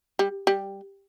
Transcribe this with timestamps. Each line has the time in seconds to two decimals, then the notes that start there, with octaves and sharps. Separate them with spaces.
0.19 G3
0.47 G3